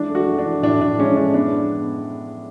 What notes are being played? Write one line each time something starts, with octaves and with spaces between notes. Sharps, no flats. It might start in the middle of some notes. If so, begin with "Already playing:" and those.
Already playing: E3 G#3 D4
A3
F#4
A3
D4
E3
A2 D4
A2 D4
G#3 C#4
A2 D4
B3 D4
B3